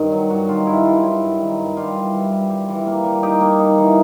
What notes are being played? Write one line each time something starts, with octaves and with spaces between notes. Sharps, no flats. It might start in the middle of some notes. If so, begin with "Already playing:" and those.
Already playing: G2 D#3
F#3
G2 F#4
D#3 F4
G2 E4
G2 F4
F#3 E4
G2
D#3
G2
G3 F4
E3
E3
G3
G3
E3
A#3
G3
D#4 G4
A#3
D#4
E3